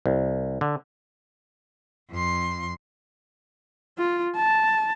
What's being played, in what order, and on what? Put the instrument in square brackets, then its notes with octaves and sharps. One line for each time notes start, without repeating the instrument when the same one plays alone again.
[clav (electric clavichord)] C2
D3
[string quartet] F2 C6
[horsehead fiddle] F4
A5